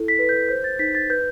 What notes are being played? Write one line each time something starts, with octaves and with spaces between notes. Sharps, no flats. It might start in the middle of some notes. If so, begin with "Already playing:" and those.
Already playing: E4 A4
B6
B4
G6
C5 G6
A6
D#4 B6
A6
B4 G6